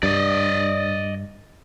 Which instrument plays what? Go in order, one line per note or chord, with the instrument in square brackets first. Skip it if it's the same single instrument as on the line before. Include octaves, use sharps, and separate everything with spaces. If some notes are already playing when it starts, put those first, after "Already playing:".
[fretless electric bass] G2 [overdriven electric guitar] D5 D#5